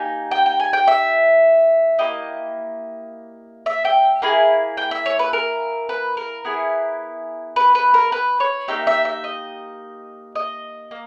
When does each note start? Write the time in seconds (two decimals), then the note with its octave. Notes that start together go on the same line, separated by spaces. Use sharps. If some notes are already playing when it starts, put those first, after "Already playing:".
Already playing: A#3 D#4 G4 G#5
0.31 G5
0.46 G5
0.60 G#5
0.73 G5
0.87 E5
1.99 A#3 E4 G4 D#5
3.66 E5
3.85 G5
4.22 A#3 E4 G#4
4.77 G5
4.91 E5
5.06 C#5
5.19 B4
5.33 A#4
5.89 B4
6.17 A#4
6.45 B3 E4 G#4
7.56 B4
7.75 B4
7.94 A#4
8.12 B4
8.40 C#5
8.68 A#3 D#4 G4 E5
8.87 E5
9.05 E5
9.24 D#5
10.36 D#5
10.91 A#3